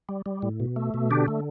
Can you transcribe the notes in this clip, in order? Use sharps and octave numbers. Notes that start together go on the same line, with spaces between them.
G3
G3
A2
B2
A3
B2
D3 D4 G4
A3